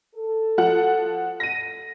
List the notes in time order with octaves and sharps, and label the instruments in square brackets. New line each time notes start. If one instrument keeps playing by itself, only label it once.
[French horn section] A4
[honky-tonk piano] F3 F#5
A#6 D#7